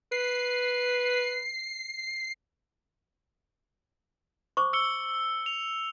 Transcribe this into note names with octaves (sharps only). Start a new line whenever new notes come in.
B4 C7
C5 C#6 D6
E6 C#7 G7
F7